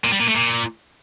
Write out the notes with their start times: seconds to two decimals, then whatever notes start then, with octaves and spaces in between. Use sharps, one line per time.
0.04 A#2
0.12 G3
0.19 A#2
0.27 A3
0.35 A#2